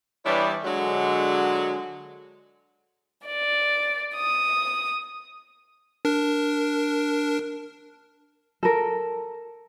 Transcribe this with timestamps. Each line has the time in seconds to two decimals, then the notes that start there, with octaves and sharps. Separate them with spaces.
0.26 E3 G3 B3 D4 E4 C#5
0.64 D3 F#3 G#3
3.25 D5
4.15 D#6
6.05 D4 A#4
8.63 A4 A#4